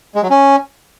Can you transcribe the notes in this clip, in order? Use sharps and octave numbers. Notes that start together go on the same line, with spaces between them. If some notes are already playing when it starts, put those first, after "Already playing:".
G#3
F#3
C#4